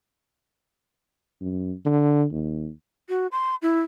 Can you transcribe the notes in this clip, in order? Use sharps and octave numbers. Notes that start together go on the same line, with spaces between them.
F#2
D3
D#2
F#4
C6
E4